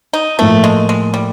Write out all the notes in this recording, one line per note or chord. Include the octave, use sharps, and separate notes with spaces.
D#4
A2 F3 A3 A#3
G#3
G#3
G3